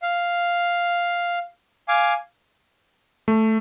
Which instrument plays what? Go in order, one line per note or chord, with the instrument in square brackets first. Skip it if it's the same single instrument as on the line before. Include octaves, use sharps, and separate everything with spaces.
[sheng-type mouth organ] F5
F5 G#5 D6
[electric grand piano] A3